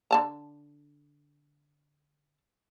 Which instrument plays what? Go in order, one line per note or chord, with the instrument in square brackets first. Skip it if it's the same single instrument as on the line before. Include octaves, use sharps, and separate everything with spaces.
[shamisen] D3 A5 A#5